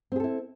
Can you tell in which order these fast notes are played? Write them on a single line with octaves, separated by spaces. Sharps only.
C4 G#4 A4 E4